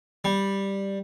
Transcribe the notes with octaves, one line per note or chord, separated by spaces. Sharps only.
G3